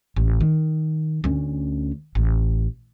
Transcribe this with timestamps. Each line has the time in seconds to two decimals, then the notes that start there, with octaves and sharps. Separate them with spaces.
0.16 A1
0.41 D#3
1.24 D2 C#4
2.15 A1